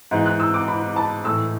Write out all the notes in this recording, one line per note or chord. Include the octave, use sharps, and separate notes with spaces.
G#2 E3
F#6
E6
D6
B5
A5
A2 E3 E6